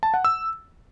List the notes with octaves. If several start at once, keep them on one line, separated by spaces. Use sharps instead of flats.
A5
F#5
E6